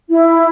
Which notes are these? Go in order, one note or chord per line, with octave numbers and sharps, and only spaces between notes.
E4